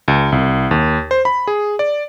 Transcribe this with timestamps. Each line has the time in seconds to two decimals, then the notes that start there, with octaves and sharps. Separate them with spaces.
0.08 C#2
0.32 C2
0.71 D#2
1.11 C5
1.25 B5
1.47 G#4
1.79 D5